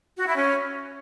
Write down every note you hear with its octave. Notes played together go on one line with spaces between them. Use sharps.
F#4
E4
C#4